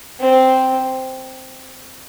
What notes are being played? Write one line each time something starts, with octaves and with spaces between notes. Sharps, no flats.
C4